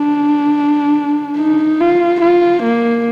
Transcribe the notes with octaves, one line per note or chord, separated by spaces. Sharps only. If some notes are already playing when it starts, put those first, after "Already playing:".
Already playing: D4
D#4
F4
F4
A#3